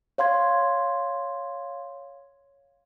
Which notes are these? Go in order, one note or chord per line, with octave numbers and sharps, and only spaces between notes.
C#5 F5 C6 G#6